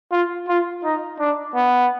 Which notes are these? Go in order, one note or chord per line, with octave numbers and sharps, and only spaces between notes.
F4
F4
D#4
D4
B3